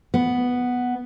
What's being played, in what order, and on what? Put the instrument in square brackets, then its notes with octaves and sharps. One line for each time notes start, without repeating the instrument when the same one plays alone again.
[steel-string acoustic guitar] B3